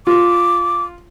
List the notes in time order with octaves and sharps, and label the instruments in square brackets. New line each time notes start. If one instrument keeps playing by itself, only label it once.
[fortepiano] F4 [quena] D6